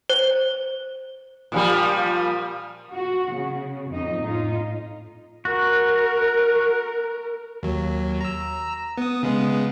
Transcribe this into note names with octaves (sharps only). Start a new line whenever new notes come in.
C5
A#2 F3 G3
F#4
C#3
F2 D#4 D#5
A2 D#4 F4
F#4 A#4
D#2 F#3
A#5 E6
B3 D#6
C#3 G#3 B3